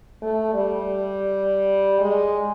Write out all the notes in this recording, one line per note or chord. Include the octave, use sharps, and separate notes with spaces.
A3
G3
G#3